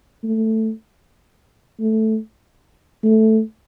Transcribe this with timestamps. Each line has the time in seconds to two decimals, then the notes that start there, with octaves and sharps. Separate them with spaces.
0.24 A3
1.80 A3
3.03 A3